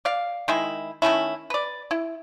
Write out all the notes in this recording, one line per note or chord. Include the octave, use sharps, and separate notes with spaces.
D5 F5
D#3 G#3 E4
D#3 A3 C#4 E4
B4 D5
E4